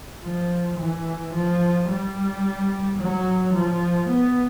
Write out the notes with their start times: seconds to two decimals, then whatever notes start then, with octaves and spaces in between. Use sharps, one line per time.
0.23 F3
0.79 E3
1.34 F3
1.89 G3
2.99 F#3
3.54 F3
4.09 B3